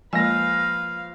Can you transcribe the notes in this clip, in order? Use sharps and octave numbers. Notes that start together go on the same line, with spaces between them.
F3 G#3 A#3 B4 F5 G#5 A#6